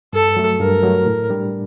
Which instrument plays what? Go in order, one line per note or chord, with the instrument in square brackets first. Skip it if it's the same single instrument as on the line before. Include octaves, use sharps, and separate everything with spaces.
[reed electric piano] G2 [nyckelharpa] A4
[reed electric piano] F#3 A3
[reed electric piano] G2 [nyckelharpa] A#4
[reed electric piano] F#3 A3
A2
G3 D4